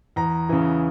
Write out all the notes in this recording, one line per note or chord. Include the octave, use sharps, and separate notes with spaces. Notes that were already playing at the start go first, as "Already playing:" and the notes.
E2 A#5
C#3 E3